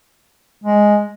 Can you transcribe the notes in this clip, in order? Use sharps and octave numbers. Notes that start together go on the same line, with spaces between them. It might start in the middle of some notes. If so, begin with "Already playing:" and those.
G#3